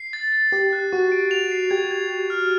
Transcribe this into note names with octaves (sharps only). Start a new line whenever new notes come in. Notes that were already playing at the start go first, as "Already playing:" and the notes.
Already playing: C7
A6
A6
G4 A6
F#6
F#4 C#6
D7
F7
C7
G4 G#6
G#6
G#6
F6